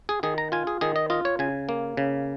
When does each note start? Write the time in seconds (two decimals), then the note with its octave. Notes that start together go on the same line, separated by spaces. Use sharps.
0.09 G#4
0.23 D#3 G#4
0.38 A#5
0.52 F4 G#5
0.67 G#4
0.81 D#3 G#4
0.96 D#5
1.10 F4 D#5
1.25 C#5
1.39 C#3 G#5
1.69 A#3
1.97 C#3